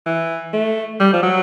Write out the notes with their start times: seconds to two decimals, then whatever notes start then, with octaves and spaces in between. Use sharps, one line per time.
0.06 E3
0.53 A3
1.00 G3
1.13 F3
1.22 F#3